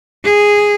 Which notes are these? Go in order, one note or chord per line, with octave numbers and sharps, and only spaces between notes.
G#4